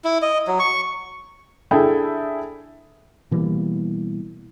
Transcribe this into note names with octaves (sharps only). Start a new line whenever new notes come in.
E4
D#5
F#3
C#6
D4 E4 G#4 A4 E5 G5
B2 E3 G3 A#3